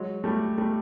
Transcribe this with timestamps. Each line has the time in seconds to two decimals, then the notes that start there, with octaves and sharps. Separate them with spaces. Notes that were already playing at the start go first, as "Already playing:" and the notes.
Already playing: F#3 G#3
0.24 G3 A3
0.58 G3 A3